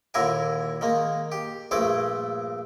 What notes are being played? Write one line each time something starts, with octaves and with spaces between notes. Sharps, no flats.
D#2 A#2 D3 E4 A#4 G#5
D#3 G#3 A#3
G4
A#1 G2 A3 G#4 C5 D6